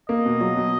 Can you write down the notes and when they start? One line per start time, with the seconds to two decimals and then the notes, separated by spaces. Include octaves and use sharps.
0.09 A#3 D#5
0.25 B2
0.40 F#3
0.56 B2